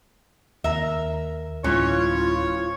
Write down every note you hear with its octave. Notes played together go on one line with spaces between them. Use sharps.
D#2 A#4 E5
D1 E3 F3 G#3 C#4 F4 C#5